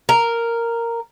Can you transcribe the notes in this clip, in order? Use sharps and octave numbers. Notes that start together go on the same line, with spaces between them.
A#4